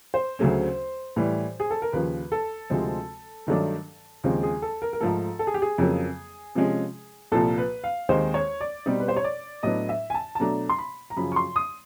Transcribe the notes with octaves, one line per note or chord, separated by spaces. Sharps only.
C5
D2 C#3 F#3 A3 C#4
A2 E3 G3
G#4
A4
A#4
D#2 C#3 F3 B4
A4
D2 C3 F3 G#3 C4
G2 D#3 F#3 A3 D4
D#2 C#3 F3 G#3 C4
G#4
A4
A#4
A#4
G#2 F3 A3 A4
A4
G#4
G4
G#4
F2 C#3 F#3 A#3
C3 F3 G#3 C#4
C2 A#2 F3 A4
B4
F5
D#2 D#3 G#3 C4 D#4 C5
C#5
D5
B2 G3 C4 D#4
B4
C5
C#5
D5
A2 F#3 B3 D4 D#5
E5
G#5
A5
A5
B2 F#3 A3 D4 A#5
C6
B5
A#5
F#2 C#3 F3 B5
C#6
C6
D#6